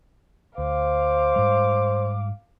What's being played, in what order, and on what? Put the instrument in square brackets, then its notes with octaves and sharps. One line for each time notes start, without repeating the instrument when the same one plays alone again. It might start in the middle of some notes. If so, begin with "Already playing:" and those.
[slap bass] D2 [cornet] C5 [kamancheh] F5 D6
[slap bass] G#2 G3